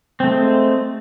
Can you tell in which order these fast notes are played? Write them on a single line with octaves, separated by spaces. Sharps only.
C4 A3 G#3